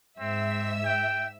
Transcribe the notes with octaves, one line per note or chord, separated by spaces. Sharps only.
G#2 C4 E5 E6
G5